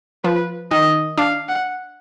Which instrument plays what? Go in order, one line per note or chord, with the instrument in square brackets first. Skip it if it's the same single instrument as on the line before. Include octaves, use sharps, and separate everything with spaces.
[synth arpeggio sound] F3 [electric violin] B4
[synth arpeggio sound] D#3 [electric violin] D#5
[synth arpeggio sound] D4 [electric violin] F5
[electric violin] F#5